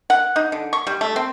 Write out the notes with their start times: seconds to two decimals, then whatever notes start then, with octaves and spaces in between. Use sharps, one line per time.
0.10 F#5
0.36 D#4
0.52 D3
0.73 C#6
0.87 G3
1.01 A3
1.16 C4